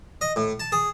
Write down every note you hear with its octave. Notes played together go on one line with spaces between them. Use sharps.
D#5
A2
A5
G#4